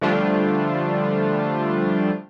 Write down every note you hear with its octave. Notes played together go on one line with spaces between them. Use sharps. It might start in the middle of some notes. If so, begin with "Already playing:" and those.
D3 F3 G3 A3 D4 F4